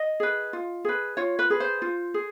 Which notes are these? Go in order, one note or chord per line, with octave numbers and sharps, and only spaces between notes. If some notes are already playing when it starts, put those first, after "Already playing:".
Already playing: D#5
G#4 B4
F4
G#4 B4
F4 C#5
B4
G#4 B4
C5
F4
G#4